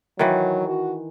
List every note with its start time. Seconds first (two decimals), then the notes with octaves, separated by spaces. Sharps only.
0.19 D#3 E3 F#3
0.68 F#4